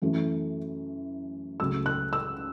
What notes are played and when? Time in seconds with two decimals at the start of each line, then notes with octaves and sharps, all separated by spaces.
0.02 F#2 E3 A3
1.60 C#2 C#3 F#3 A3 E6
1.86 F#6
2.13 E6